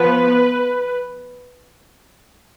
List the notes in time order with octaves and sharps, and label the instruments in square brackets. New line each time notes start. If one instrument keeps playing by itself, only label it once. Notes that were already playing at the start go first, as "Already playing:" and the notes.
Already playing: [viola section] F3 B3 B4